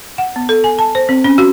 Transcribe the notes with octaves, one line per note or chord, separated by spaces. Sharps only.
F#5
B3
A4
G#5
A5
C5
C4
C#4
F#4